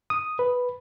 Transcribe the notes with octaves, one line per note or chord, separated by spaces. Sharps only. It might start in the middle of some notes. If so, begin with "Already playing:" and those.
D#6
B4